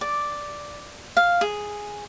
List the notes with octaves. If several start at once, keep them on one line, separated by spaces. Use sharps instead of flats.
D5
F5
G#4